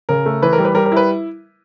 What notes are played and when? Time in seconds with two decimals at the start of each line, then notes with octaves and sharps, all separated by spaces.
0.09 C#3 A#4
0.26 A3
0.42 E3 B4
0.53 A#4
0.58 G3
0.65 B4
0.74 G3 A#4
0.86 A#4
0.92 E4 B4